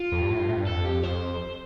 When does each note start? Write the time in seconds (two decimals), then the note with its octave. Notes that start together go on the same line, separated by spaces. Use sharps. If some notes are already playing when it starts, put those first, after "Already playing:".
Already playing: F4
0.12 F2
0.21 G2
0.31 A2
0.40 G2
0.49 A2
0.57 G2
0.67 F2 A4
0.85 G4
1.03 F2 C5